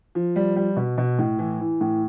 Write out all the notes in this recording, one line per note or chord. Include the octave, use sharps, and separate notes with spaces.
F3
G3
G3
B2
B2
A2
E3
E3
A2